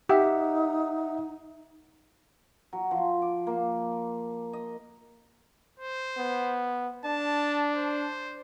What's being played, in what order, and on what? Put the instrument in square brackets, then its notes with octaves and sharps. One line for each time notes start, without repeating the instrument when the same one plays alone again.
[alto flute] D#4 [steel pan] G4 [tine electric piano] E5 F#5
[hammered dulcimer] F#3
F3
D6
A#3
D#5
[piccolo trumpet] C5
[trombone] B3
[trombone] D4 [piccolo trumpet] A5
[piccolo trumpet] C5